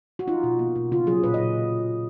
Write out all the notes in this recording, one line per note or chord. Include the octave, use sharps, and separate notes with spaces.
F#4
D#4 F4
B2
A#3
B2
C#3 F4
F#3 G#4
A#2 B4
D#5
A#2